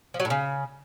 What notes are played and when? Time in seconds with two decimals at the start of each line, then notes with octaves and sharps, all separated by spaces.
0.14 F3
0.20 F#3
0.25 A2
0.30 C#3